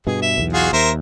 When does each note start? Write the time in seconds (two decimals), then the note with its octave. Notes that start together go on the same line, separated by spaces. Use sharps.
0.07 G2 B2 G#4
0.22 E5
0.38 B1 E2
0.53 F4 F#4 G#4
0.73 D#2 A#4 C5 E5